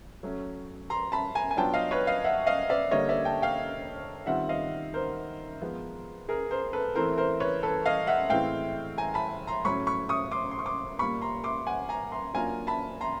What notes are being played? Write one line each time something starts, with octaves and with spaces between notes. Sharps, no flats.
F#3 A3 C#4
A#5 C6
A5 B5
G#5 A#5
G#5
F#3 B3 D4 F4 G5 A5
D#5 F5
B4 C#5
D#5 F5
E5 F#5
D#5 F5
D5 E5
D3 G3 A#3 C#5 D#5
D5 E5
G5 A5
F5 G5
D#3 G3 C4 F4 E5 F#5
D#5 F5
A#4 C5
F3 G#3 B3
G#4 A#4
A#4 C5
A4 B4
E3 A3 C4 E4 A#4 C5
A#4 C5
B4 C#5
A4 B4
D#5 F5
E5 F#5
A2 E3 G#3 C4 E4 F5 G5
G#5 A#5
A5 B5
A#5 C6
A2 F#3 A3 C#4 B5 C#6
B5 C#6
C#6 D#6
C6 D6
C6
C#6
C6 D6
A#2 G3 A#3 B5 C#6
A#5 C6
C6 D6
F#5 G#5
G#5 A#5
A#5 C6
F#3 A#3 D4 F4 G#5 A#5
A5 B5
A#5 C6